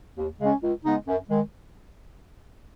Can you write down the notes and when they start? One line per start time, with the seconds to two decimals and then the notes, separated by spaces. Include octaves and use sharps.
0.17 D#2
0.40 C#3 G#3 C#4
0.62 C#2
0.84 C#3 G#3 B3 D#4
1.06 F#2
1.29 D#3 G#3